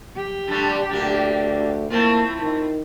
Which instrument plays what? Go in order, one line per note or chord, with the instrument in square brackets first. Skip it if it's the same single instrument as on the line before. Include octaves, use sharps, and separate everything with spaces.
[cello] G4
[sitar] D3 G3 A3
[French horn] D2 [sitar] D3 A#3
[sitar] A3 C4 F4 [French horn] A#3 [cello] E4
[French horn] D#3